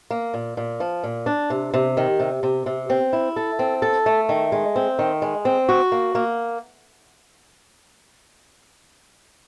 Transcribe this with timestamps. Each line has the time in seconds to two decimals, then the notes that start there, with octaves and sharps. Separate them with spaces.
0.11 A#3
0.34 A#2
0.57 A#2
0.80 F3
1.04 A#2
1.26 D4
1.50 C3
1.74 C3
1.97 D#3
2.20 C3
2.43 C3
2.66 C3
2.90 C4
3.13 E4
3.36 A4
3.59 C4
3.82 A4
4.06 A3
4.29 D#3
4.52 G#3
4.76 C4
4.99 D#3
5.22 G#3
5.45 C4
5.69 F#4
5.92 A#3
6.15 A#3